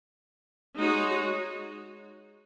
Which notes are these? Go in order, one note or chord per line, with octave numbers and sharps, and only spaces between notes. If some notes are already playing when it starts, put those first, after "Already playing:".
G#3 D#4 F#4 C#5